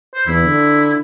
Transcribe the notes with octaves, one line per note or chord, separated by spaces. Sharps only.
C5
E2 E4
D3